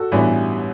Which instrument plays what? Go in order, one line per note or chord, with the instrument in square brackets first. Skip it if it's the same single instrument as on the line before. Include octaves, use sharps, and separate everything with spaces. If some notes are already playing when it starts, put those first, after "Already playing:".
Already playing: [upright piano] F#4 A4
A1 G2 E3 G3 B3